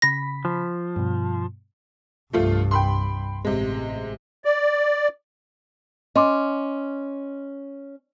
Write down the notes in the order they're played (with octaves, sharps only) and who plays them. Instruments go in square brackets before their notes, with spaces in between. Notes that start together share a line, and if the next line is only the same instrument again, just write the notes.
[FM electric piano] C#3 B5 B6 [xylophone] A#6
[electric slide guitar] F3
[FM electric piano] G2 B2
[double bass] C2 G2 [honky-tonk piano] F3 A3 F4
[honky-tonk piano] G5 B5 C6
[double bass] A1 [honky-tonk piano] C3 G#3
[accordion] D5
[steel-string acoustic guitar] C#4 [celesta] D#5 C6 D6